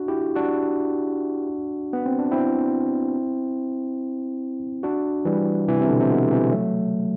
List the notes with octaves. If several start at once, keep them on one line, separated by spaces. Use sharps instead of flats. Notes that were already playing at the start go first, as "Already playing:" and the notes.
Already playing: D4 F#4
E4 G4
D4 F#4
B3
C4
D4
C4 E4
D4 F#4
E3 G3
C3 E3
C3
B2 D3
C3
B2 D3
C3 E3
F#3 A3